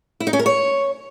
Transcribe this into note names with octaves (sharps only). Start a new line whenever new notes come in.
E4
D#4
C#4
A#4
C#5